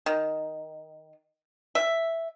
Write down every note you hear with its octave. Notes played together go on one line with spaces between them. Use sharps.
D#3
E5